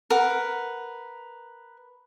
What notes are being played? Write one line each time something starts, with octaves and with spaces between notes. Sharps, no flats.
A#4 B4 F#5